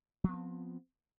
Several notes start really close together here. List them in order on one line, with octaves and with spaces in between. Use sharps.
F3 B3 C4